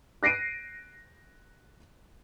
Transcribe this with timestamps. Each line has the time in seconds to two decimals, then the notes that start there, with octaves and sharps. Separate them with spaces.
0.23 F#6 A#6 C7 D7 D#7